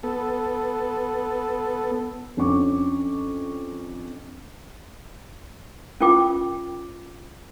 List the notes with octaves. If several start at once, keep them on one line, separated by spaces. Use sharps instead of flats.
B3 A4
F2 C#4 D4 C#6 D6
C#4 F4 A#4 G5 D6